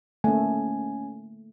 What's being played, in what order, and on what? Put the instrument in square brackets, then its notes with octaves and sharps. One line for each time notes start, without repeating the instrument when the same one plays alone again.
[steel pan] A3 A#3 [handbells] C#4 G#5